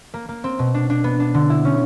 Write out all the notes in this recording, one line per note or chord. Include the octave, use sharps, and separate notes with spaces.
A#3
A#3
C4
B2
D4
D4
B3
D4
D3
E4
C#4